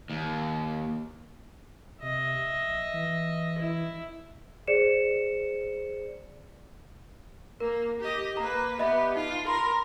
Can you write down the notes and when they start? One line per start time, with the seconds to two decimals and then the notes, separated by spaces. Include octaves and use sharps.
0.10 D#2
2.02 C3 D#5 E5
2.56 A#1
2.94 E3
3.58 E4
4.68 G#4 C5 D5 C#7 E7
7.60 A#3 A#4
7.99 G4 D#5
8.37 A#3 B4 A#5
8.79 B3 G4 D#5 E5 B5
9.16 D#4 F4
9.47 A#4 B5 C6